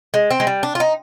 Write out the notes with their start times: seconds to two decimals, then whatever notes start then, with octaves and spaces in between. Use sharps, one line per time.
0.14 G#3
0.30 C4
0.40 G#3
0.47 G3
0.63 D4
0.75 F4
0.80 D#4